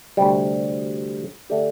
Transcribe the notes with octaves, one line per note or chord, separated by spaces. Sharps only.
D2 C3 G3
D3 A3 D4 G4